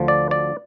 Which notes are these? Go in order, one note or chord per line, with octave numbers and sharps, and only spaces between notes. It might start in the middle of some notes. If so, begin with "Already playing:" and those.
Already playing: D2 D3 F3
D5
D5